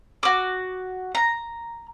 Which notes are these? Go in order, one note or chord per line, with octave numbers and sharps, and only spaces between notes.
F#4 D6
A#5